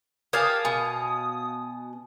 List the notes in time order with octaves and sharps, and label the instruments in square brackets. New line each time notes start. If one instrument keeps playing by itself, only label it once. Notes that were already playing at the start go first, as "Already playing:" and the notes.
[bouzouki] G4 [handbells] A#4 G#5 [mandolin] C#5 F5 A5 [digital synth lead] D#6
[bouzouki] B2 [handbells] G#5